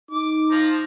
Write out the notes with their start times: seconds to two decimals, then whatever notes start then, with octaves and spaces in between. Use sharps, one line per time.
0.11 D#4 D6
0.51 F3 A#5